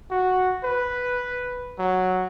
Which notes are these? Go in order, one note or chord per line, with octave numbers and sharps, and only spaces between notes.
F#4
B4
F#3